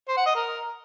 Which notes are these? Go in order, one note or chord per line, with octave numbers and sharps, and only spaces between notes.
C5
F#5
D#5
A#4